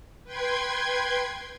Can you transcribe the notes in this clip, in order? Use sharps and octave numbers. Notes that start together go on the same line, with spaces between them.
B4 G5 C6 G#6